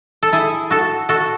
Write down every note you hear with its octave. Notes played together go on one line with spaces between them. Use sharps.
A4
E4 G#4
F#4 A4
F#4 A4